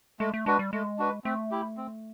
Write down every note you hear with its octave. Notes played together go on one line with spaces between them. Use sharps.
G#3 A3
A3
G#3 D4 F#4 B4
G3
G#3 A3
D4 F#4 B4
A3 C4
E4 G4
C4